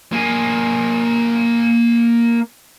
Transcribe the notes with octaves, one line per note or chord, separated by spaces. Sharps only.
A#3 G#4